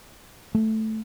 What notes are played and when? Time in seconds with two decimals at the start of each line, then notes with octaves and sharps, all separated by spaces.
0.55 A3